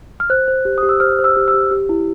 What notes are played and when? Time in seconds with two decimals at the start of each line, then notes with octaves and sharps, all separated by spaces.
0.20 F6
0.30 C5 F#6
0.48 C5
0.65 G4
0.78 G4 D#6
0.89 E6
1.00 C5 F6
1.19 C5
1.24 E6
1.37 G4
1.48 E6
1.54 G4
1.71 G4
1.89 E4